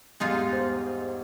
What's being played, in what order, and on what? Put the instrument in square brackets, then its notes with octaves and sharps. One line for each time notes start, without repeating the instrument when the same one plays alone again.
[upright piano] E2 G#2 G3 [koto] G#3 D#4 F4
[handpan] C5